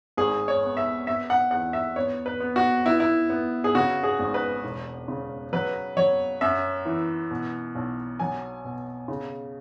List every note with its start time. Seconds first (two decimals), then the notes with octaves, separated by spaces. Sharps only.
0.17 G#1 G#4
0.48 C#5
0.63 B3
0.77 E5
1.07 B3 E5
1.30 F#5
1.51 E2 F#5
1.73 E5
1.96 B3 C#5
2.26 B4
2.40 B3
2.56 F#4
2.86 B3 E4
3.00 E4
3.30 B3
3.64 G#4
3.75 C#3 F#4
4.03 G#4
4.19 G#1
4.34 B4
4.64 E1
5.08 C#3
5.53 F#3 B4
5.97 F#3 C#5
6.41 F#2 E5
6.86 E3
7.31 B2
7.75 B1
8.20 F#3 G#5
8.65 B2
9.08 C#3